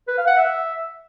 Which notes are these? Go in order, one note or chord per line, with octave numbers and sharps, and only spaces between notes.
B4
F5
F#5
E5